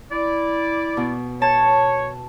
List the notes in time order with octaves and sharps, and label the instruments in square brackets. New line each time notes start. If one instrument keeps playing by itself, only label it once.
[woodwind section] E4 D5
[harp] B2
[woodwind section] C#5 [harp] A5